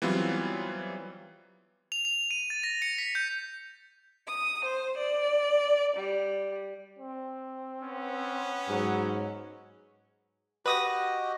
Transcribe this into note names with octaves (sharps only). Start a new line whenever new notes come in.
E3 F#3 G3 B3 C4 F4
F7
F7
D#7
A6
A#6
C#7
B6
G6
D#6
C5
D5
G3
C4
B3 C#4
G#2 F#3
F#4 G4 B4 D#5 D#6 A#6